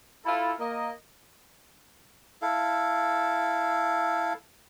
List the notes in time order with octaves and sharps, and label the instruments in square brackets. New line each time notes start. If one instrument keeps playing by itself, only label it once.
[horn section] E4 F4 A4
A#3 D#5
[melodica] E4 A4 F5